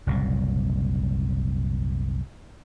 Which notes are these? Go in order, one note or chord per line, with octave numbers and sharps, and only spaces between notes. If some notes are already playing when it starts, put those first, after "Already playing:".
F#1 C2 A#2